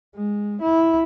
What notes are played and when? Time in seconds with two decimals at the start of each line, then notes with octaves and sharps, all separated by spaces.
0.15 G#3
0.62 E4